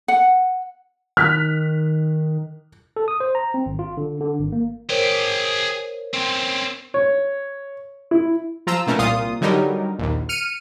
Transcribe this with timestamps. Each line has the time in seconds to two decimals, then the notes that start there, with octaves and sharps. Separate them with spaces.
0.08 F#5
1.17 D#3 F6 F#6 B6
2.96 A4
3.08 D#6
3.20 C5
3.35 A#5
3.54 C4
3.66 G#1
3.79 F4
3.97 D3
4.21 D3
4.40 G#1
4.52 A#3
4.89 G#4 A#4 C5 C#5 G5
6.14 C4 C#4
6.94 C#5
8.11 E4
8.67 F3 F4 A#5 E6
8.87 B2 A3 C#4 A#4
8.98 C2 A#2 F4 D#6
9.41 D3 F#3 G3 D#4 A#4
9.98 A#1 D#2
10.29 F6 C#7 D#7